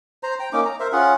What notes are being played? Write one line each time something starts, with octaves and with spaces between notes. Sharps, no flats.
C5 A#5
G5 A#5
A#3 C#4 D#4 D6
A#5
A#4 C5 E5
C#4 F4 G#4 F#5